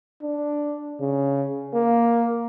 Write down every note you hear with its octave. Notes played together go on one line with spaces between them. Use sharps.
D4
C#3
A#3